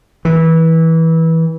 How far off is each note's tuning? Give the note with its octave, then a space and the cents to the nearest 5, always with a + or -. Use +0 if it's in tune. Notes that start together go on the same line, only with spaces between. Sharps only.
E3 -20